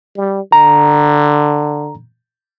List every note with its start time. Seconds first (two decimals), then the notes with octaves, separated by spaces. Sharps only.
0.17 G3
0.52 D3 A#5